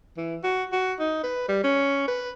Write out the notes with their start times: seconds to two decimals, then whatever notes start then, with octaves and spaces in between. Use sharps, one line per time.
0.17 E3
0.43 F#4
0.72 F#4
0.99 D#4
1.23 B4
1.48 G3
1.63 C#4
2.08 B4